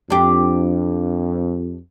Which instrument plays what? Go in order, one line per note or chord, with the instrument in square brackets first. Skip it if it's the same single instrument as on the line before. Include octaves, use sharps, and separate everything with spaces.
[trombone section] F2 [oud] D4 G4